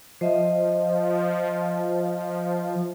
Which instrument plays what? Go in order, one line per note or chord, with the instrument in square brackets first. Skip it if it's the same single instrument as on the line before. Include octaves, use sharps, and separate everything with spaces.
[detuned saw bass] F3 [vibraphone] C5 D#5 E5